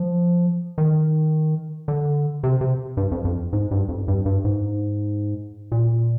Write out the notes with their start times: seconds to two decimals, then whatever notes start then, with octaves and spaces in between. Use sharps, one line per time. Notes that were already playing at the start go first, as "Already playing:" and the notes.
Already playing: F3
0.78 D#3
1.88 D3
2.44 C3
2.61 C3
2.97 G2
3.12 F2
3.25 F2
3.53 G#2
3.71 G2
3.89 F2
4.08 G2
4.26 G2
4.45 G#2
5.72 A#2